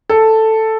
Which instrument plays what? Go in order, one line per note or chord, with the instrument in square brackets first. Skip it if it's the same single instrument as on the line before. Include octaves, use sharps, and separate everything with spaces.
[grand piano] A4